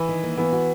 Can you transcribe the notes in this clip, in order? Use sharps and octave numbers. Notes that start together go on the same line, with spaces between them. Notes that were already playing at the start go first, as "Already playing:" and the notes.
Already playing: E3
D#3
A#3
E3 B3
F#4